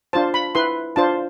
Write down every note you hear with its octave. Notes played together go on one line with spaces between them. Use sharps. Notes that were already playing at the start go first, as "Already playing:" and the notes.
D4 F4 C5 A5
B5
E4 B4 C6
D4 F4 C5 A5